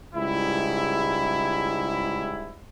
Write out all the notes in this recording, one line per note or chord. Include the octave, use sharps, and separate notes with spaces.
C#2 G#2 G3 E4